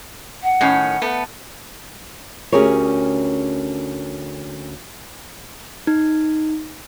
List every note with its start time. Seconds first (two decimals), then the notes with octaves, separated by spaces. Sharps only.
0.43 F#5
0.61 A2 D#3 C#4
1.02 A3 B3
2.52 D2 C#4 G4 G#4 A#4 C#5
5.87 D#4